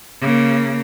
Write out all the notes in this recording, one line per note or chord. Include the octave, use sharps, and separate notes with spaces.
C#3 A#3